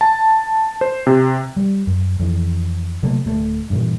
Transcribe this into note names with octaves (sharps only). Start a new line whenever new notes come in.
A5
C5
C3
G3
F#2
F2 E3
C3 F#3 A3 A#3
D1 A3
G2 A#2 E3